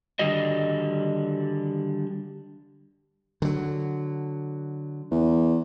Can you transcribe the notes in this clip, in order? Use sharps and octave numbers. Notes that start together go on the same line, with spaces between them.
D3 D#3 G3 D4 F#4 D#5
D3 F#3
E2